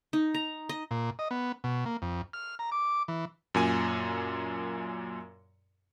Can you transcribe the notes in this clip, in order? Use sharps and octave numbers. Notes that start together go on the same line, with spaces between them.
D#4
A#5
D#5
A#2
D#5
B3
B2
A#3
F2
F6
A#5
D6
E3
F#2 A#2 G#5